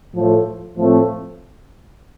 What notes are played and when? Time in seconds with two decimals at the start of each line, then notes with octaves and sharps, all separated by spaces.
0.13 A2 F3 A3
0.75 A2 F3 A3 C4